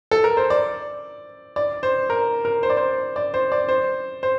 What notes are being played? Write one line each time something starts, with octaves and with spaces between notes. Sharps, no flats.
A4
A#4
C5
D5
D5
C5
A#4
A#4
C5
D5
C5
D5
C5
D5
C5
C5